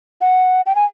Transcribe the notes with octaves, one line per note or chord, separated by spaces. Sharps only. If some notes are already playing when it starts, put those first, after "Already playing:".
F#5
G5
G#5